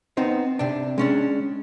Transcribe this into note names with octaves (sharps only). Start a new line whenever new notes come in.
B3 C4 D#4 C5
C3 D4
G#3 C#4 D4